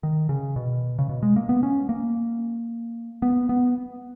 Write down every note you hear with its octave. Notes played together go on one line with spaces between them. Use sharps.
D#3
C#3
B2
C#3
B2
G#3
A#3
B3
C#4
A#3
B3
B3